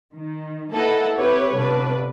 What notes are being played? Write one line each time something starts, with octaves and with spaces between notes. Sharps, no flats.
D#3
A#3 E4 A4 B4 D#5 F#5
C4 E4 G4 B4 C#5
G1 C3 D4 B4